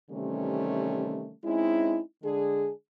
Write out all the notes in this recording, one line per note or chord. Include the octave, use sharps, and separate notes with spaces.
C3 D#3 E3 G3 A3 C#4
G#3 C4 C#4 D#4 E4
D3 G#3 D4 G#4